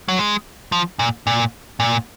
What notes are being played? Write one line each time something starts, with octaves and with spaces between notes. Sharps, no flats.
F#3
G#3
F3
A#2
A#2
A#2